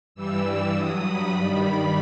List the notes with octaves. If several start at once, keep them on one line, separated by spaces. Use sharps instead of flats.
G2 E3 G3 E6
G2 F#3 D#6
B5
G2 D#3 G3
B5